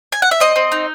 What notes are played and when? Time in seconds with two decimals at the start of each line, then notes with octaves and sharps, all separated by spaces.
0.12 G#5
0.22 F#5
0.31 E5
0.40 C4 D#5
0.56 C4
0.72 D#4